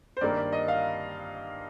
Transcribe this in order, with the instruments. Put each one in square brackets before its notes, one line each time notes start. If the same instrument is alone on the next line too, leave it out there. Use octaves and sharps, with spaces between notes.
[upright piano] C5
G2 D#3 A#3 D5
D5
D#5
F5